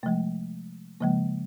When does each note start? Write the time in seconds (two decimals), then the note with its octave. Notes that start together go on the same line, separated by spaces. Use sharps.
0.03 C3 F3 G#3 A3
1.00 C#3 F3 G#3 A#3